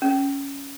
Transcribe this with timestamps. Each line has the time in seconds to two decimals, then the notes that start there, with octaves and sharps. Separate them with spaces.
0.02 C#4